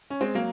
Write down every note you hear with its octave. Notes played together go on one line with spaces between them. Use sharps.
C#4
G#3 C4
F#3 A#3